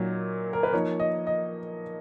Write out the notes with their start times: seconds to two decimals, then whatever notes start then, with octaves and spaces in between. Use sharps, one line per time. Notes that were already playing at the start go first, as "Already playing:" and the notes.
Already playing: A#2 F#3 A#3 D#4
0.53 A#4
0.63 B4
0.73 F3 A#3 D#4 C#5
1.00 D#5
1.27 D#5